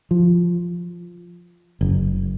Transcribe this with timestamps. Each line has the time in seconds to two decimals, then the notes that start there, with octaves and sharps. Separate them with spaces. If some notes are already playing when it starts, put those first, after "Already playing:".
0.11 F3
1.81 F#1